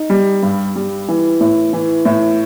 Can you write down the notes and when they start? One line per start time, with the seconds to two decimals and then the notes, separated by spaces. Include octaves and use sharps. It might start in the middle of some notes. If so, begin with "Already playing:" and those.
Already playing: D#4
0.10 G3
0.43 G2
0.76 G3
1.08 E3
1.40 A2
1.73 E3
2.05 A2